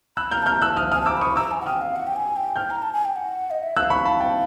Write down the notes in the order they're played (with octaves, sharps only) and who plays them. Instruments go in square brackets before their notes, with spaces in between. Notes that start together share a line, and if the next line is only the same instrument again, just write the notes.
[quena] B5 [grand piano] E6 F#6
[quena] A#5 [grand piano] F6 G6
[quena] A5
[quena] A#5 [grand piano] F6 G6
[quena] A5 [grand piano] E6 F#6
[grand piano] D#6 F6
[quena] G#5 [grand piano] D#6 F6
[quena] A5
[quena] A#5 [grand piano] D6 E6
[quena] B5 [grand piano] C#6 D#6
[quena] A#5 [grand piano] D6 E6
[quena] G#5
F#5
[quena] G5 [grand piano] D#6 F6
[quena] F5
F#5
G5
G#5
G5
[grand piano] F6 G6
[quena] A#5
A5
G#5
G5
F#5
D#5
E5
[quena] F5 [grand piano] E6 F#6
[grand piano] B5 C#6
A5 B5
G5 A5